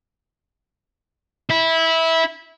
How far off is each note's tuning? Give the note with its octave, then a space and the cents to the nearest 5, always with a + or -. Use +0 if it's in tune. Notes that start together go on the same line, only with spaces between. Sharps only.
E4 -15